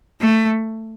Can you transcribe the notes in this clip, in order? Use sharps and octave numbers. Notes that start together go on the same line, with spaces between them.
A3